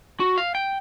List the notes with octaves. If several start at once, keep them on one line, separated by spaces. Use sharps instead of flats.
F#4
F5
G5